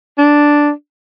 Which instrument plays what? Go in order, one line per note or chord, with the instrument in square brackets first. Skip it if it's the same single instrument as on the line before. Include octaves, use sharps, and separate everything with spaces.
[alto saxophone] D4